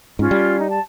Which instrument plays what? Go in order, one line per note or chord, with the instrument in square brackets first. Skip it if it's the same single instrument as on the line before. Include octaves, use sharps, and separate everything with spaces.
[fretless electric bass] G#2 [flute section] C#4 F4
[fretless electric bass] G3
[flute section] D#4
A5